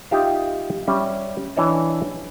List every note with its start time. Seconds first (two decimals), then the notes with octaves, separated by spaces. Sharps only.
0.11 D#4 F4 G4 E5 F5
0.87 G3 C#4 E5
1.56 E3 D4 C#5 D#5 A5